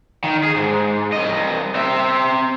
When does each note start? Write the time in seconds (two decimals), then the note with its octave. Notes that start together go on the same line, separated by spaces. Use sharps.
0.24 D#3
0.43 G#4
0.56 G#2
1.13 C2 D#5
1.75 C4 E5